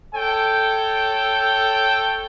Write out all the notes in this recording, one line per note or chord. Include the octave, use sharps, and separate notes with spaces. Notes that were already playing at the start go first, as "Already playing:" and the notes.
A4 C#5 G5